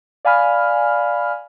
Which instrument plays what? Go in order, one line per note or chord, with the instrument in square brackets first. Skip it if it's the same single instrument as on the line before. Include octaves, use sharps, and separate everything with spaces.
[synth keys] D5 F5 G#5 B5 F6